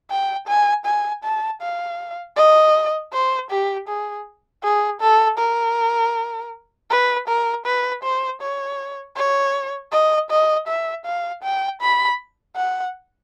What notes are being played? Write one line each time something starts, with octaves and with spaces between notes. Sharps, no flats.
G5
G#5
G#5
A5
F5
D#5
C5
G4
G#4
G#4
A4
A#4
B4
A#4
B4
C5
C#5
C#5
D#5
D#5
E5
F5
G5
B5
F#5